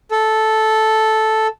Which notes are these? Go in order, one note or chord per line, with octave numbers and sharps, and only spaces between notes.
A4